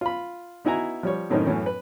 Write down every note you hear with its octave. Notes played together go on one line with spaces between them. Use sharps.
F4 B5
B3 D#4 E4 F#4 G#5 A#5
F3 G3 C#5
F#2 A2 D#3 C4 C#4 D#4
F#2 A2 E3 C#4
B4